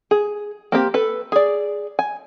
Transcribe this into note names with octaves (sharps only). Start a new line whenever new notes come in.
G#4
A#3 C4 G4
A4 B4
G#4 D5
G#5